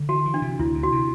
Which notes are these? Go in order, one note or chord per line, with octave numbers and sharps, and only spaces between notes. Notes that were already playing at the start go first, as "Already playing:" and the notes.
Already playing: D3
E3 F#4
E3
D4
C3
D2 E4
C3
F#4
C3